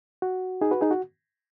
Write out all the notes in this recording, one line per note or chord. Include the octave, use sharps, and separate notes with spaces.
F#4
D#4 G#4
F#4 B4
D#4 G#4
F#4